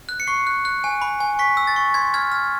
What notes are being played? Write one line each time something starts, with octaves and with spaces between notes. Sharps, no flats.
F#6
C#7
C#6 C7
F#6
F#6
G#5
B5
G#5
C#6 B6
E6
A6
C#6
C6 G#6
F6 G#6
F6 G#6